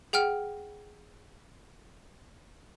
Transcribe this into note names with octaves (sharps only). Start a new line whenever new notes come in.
G#4 F#5 G5 F6